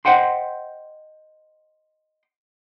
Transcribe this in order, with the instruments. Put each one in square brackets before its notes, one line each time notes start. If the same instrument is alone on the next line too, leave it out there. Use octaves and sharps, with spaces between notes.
[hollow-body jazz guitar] C5 D#5 F#5 G5 C6